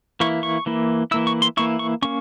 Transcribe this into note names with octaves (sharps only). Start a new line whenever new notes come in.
E3 A#3 E4 C#6
C#6
E3 A#3 E4
E3 A#3 E4 E6
C#6
C6
E3 A#3 E4 C#6
C#6
A#3 C#4 C#6